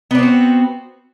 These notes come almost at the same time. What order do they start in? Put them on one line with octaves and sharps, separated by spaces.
B3 D4 C4 F#4